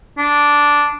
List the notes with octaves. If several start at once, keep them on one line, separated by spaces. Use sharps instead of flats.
D4